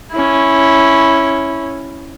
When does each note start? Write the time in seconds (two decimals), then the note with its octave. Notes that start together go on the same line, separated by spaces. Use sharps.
0.12 C#4 E4